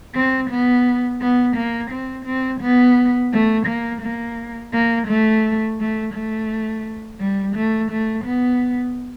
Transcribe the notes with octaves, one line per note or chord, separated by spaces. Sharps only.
C4
B3
B3
A#3
C4
C4
B3
A3
A#3
A#3
A#3
A3
A3
A3
G3
A3
A3
B3